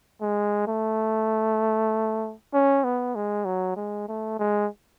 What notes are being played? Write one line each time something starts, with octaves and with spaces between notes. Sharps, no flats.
G#3
A3
C#4
B3
G#3
F#3
G#3
A3
G#3